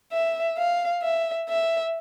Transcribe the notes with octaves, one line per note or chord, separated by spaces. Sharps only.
E5
F5
E5
E5